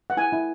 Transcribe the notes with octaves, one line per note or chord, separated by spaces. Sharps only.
F#5
E4 G#5
E4